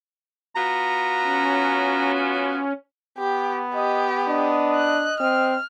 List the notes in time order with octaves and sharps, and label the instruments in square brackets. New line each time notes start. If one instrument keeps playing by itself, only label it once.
[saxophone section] B3 F4 F#4 [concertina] A#5
[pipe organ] C#4
[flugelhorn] B3 [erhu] G4
[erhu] G4 [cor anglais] D#5
[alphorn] D4 [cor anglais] D#5
[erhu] F#6
[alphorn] C4 [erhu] F6